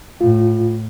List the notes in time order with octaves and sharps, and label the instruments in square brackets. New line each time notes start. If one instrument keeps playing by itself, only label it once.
[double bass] A2 [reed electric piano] F4